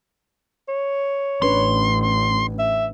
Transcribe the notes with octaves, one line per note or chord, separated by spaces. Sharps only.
C#5
A1 C#4 D4 B4 C6
E5